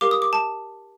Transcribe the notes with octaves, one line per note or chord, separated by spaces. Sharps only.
G4 A#4 F5 D6
D#6
D6
A5